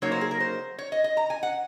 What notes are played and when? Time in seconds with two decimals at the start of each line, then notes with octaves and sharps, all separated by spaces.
0.02 C#3 F#3 A#3 D#4 C#5
0.12 C5
0.21 G#4
0.31 A#4
0.40 C5
0.78 C#5
0.92 D#5
1.04 D#5
1.17 A#5
1.30 G#5
1.43 F#5